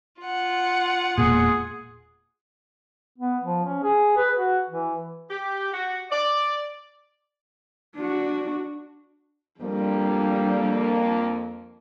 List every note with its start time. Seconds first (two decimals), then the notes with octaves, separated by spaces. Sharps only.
0.21 F4 F#5
1.18 E1 A#2 G#4
3.18 B3
3.43 F3
3.65 C#4
3.83 G#4
4.17 B4
4.37 F#4
4.70 E3
5.30 G4
5.73 F#4
6.11 D5
7.96 D4 F#4
9.61 F2 G3 A#3 D4